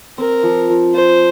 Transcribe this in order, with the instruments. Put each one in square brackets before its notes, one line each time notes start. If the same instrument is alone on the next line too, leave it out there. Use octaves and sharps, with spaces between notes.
[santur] C4 [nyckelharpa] A#4
[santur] F3
F3
[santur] F4 [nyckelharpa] C5